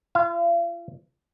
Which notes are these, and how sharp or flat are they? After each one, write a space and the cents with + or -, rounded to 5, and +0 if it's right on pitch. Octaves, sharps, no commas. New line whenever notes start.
F4 -40 F5 -35